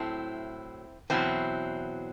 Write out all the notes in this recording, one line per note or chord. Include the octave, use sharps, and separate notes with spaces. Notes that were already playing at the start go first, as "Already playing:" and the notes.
Already playing: A2 F#3 C4 E4
E2 B2 F#3 C4 E4